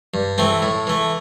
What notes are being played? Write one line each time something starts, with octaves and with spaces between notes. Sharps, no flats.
G2
E3 A3 C4
A2
E3 A3